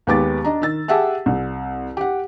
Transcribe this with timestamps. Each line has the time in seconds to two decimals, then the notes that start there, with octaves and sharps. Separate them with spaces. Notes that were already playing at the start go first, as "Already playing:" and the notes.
0.07 D#2 G#3 B3 G4 D6 A6
0.45 D4 D#5 A#5
0.61 D#3 E6 A6
0.88 G4 G#4 E5 F#5 A5 E6
1.26 C2
1.97 G4 F#5